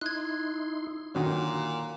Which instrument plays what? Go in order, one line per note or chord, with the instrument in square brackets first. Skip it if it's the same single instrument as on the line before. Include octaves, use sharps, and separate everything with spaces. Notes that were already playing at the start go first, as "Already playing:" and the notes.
[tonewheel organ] D#4 E4 C6 [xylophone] F#6 G#6
[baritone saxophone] A#2 [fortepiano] D3 D#3 F#3 [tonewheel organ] F#4